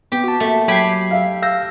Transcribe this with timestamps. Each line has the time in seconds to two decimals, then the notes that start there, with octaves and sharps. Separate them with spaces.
0.12 B3 G4
0.24 F#4 A5
0.40 A3 A#3
0.68 F#3 G4 G#5 B5 C7
1.11 E5 F5
1.42 F5 E6 G6 A#6